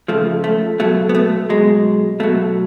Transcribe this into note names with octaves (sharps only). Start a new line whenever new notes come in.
C#3 F3 A3
A3
B2 F#3 A3
B3
A3
B2 F#3 G#3
B2 F#3 A3